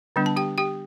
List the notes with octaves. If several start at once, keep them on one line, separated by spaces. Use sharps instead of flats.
D3 G3 B3 D4
A5
G4 G5
G4 G5